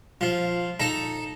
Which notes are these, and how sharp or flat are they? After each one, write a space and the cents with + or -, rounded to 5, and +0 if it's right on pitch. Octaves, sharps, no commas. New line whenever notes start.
F3 +10 F4 -5
D#4 +0 A4 +0 A#5 +0